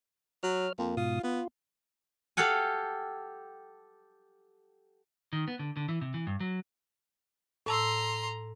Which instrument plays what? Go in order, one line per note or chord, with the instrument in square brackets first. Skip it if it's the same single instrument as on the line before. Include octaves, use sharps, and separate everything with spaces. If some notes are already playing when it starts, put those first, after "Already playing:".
[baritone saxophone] F#3 [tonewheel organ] C#5 F6
[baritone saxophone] F2 [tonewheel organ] A#3
[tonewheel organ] G#2 B2 D#6 [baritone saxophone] F4
[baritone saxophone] B3 [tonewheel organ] F4
[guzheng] G4 A4 F5 F#5 G#5
[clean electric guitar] D#3
B3
D3
D3
E3
C3
E3
G2
F#3
[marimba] A2 A5 E6 [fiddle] A#5 C6